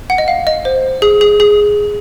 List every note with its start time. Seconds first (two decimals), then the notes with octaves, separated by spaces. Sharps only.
0.10 F#5
0.18 D#5
0.28 F5
0.47 D#5
0.65 C5
1.02 G#4
1.21 G#4
1.40 G#4